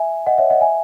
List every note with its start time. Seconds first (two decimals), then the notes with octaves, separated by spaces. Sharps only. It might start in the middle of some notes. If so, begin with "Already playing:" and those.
Already playing: E5 G#5
0.27 D#5 F#5
0.38 C#5 E5
0.50 D#5 F#5
0.61 E5 G#5